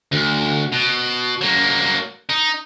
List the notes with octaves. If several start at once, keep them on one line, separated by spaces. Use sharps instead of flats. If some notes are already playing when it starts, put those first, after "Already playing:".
D2
B2
F#3 A#3
D#4